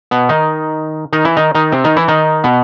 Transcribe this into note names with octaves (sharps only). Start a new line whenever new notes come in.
B2 B3
D#3 D#4
D#3 D#4
E3 E4
D#3 D#4
D#3 D#4
C3 C4
D#3 D#4
E3 E4
D#3 D#4
B2 B3